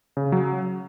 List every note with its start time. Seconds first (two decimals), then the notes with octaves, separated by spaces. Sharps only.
0.17 C#3
0.32 F#3